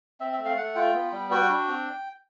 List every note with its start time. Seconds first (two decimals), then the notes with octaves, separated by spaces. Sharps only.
0.20 C4 E5
0.33 E5
0.39 A3
0.45 F5
0.57 A3 F#5
0.75 F4 G5
0.94 B3
1.12 G3
1.31 F#4 G5
1.49 D4
1.68 C4